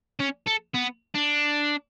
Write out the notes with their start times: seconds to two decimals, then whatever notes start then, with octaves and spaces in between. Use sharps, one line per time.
0.20 C#4
0.48 A4
0.75 B3
1.15 D4